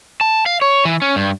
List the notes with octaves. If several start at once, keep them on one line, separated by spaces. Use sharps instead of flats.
A5
F5
C#5
E3
C#4
G2